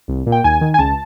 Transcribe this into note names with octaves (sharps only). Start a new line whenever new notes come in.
C2
A#2
G5
D#2 G#5
D#3
G#5
C#2 A5